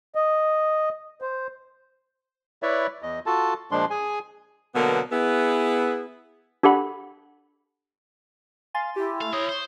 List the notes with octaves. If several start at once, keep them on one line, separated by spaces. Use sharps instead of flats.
D#5
C5
E4 B4 C#5 D5 E5
E2 D#5
F4 F#4 A4 A5
A#2 F3 G#3 D4 C6
G#4 G#5
B2 D3 F#3 A#3 B3 A#4
B3 E4 G#4
D4 G4 A4 F#5 B5
F5 G#5 C6 A6
E4 G4
A3 F5
A#4 C5 C#5 D#6
C5